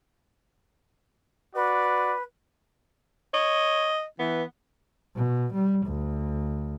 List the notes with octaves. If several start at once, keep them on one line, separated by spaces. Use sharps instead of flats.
F#4 B4 D5
C#5 D#5
E3 B3
B2
G3
D2